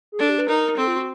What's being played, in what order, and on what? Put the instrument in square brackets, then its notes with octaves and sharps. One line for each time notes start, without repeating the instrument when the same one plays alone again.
[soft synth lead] G#4
[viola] D4 [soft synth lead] A4
[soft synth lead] G4
B4
[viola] D#4 [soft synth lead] A#4
[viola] C4 [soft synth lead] A4
[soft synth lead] F4
F#4